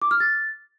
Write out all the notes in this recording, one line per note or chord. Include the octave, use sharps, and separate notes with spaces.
D6
F6
A6